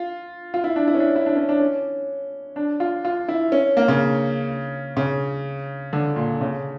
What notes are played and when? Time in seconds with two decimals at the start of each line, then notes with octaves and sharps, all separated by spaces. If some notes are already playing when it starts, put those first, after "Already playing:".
Already playing: F4
0.54 F4
0.64 E4
0.76 D4
0.87 E4
0.95 C#4
1.00 D4
1.16 E4
1.26 D4
1.36 C#4
1.49 D4
1.60 C#4
2.56 D4
2.80 F4
3.05 F4
3.28 E4
3.52 C#4
3.77 A#3
3.88 C#3
4.97 C#3
5.93 D3
6.16 A#2
6.41 C#3